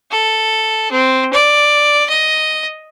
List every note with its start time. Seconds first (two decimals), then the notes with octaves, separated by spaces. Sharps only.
0.11 A4
0.92 C4
1.33 D5
2.09 D#5